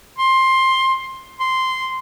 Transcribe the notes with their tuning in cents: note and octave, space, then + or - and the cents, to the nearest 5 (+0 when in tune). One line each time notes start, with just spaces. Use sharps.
C6 +15
C6 -10